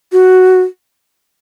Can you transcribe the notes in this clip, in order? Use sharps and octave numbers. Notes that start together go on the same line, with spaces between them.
F#4